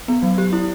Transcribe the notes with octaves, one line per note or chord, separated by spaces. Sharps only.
B3
F#3
G4
E4